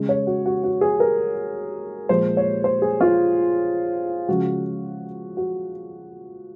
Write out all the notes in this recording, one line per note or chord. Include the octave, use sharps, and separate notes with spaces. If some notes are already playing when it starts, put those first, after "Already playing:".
Already playing: C#3 G#3
C#5
F#4
F#4
F#4
G#4
A#4
A#2 F3 G#3 C5
C#5
C5
G#4
F4
C#3 F3 G#3 F#4
F#4